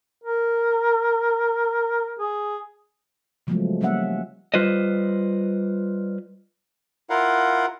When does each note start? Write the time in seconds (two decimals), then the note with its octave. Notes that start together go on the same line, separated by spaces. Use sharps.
0.24 A#4
2.19 G#4
3.47 C#3 F3 F#3 G#3 A3 B3
3.81 G3 A#3 C#4 E5 F#5
4.54 G3 F4 B4 C5 D#5
7.10 E4 F4 A#4 F5 F#5